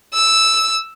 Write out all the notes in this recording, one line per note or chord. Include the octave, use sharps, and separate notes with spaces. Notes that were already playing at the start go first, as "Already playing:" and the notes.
E6